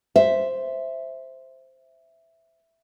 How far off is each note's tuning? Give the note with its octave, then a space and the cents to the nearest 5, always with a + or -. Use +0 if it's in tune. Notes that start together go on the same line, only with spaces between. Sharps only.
C5 +0 E5 +0